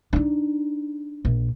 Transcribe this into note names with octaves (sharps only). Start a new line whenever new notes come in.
D4 D#4
A#1